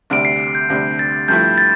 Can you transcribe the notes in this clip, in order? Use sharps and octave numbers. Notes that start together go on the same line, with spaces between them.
D2 C3 G3 D4 D7
C7
G6
D2 C3 G3 D4
A6
G2 F3 A3 E4 G6
A6